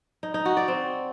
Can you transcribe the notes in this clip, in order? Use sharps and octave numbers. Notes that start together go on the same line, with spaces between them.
D#4
D#4
F#4
D5
C4